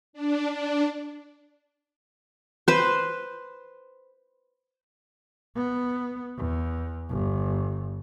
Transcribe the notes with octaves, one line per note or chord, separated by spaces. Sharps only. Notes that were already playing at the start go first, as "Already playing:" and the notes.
D4
D4
B4 C5
B3
E2
G1